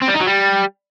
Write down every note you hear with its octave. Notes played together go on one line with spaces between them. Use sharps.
C4
G3
D#4
F#3
G3